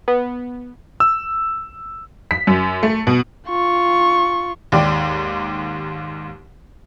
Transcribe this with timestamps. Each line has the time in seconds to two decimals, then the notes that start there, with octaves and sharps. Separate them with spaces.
0.08 B3
1.00 E6
2.31 B6
2.47 F#2
2.83 A3
3.07 B2
3.49 F4 C#6
4.72 D#2 G#2 G4 D5